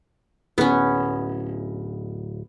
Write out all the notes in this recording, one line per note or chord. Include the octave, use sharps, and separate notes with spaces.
D1 B3 C#4